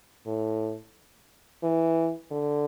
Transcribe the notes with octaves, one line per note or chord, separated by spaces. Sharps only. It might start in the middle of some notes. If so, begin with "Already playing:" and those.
A2
E3
D3